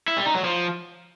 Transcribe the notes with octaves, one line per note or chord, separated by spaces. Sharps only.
E4
G3
D#4
F#3
F3